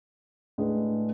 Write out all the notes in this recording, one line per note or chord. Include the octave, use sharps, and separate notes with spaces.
A2 G#3 D4 G#4 B4